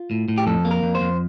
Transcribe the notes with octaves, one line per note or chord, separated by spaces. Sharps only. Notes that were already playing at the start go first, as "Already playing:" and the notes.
Already playing: F4
A2
A2
G4
F2 A4
A#3
A#4
F2
C5
F2